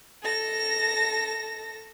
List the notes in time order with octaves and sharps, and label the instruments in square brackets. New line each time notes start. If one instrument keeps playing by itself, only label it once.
[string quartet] A4 A#6